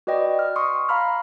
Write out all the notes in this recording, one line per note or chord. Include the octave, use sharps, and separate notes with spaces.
F#4 B4 D5 D#5 G5
F6
C6 C#6 D#6
F5 A#5 B5 F6